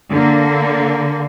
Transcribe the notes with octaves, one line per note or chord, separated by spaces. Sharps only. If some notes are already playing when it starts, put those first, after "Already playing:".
D3 A#3